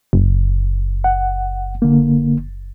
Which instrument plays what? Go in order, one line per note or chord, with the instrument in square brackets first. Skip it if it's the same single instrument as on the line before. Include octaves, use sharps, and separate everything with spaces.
[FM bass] F#1
[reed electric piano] F#5
D3 A#3